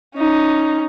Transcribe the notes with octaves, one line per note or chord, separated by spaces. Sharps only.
C#4 D#4